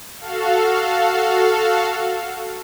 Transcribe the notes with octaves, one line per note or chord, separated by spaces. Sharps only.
F#4 A4 F5